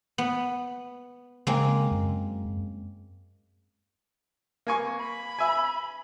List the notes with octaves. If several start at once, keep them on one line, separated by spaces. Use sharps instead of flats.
B3
C#3 G#3 A#3 C4
F#2
A#3 G#5 C#6
B5
E5 G#5